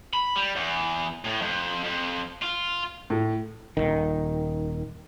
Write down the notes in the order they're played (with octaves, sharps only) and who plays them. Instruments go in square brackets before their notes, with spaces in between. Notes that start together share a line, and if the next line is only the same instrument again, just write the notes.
[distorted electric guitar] B5
G3
E2
A2
F2
F2
F4
[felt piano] A2
[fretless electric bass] D#1 A#1 D#3